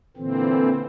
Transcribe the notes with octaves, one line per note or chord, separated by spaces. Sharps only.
A#2 D3 E3 C4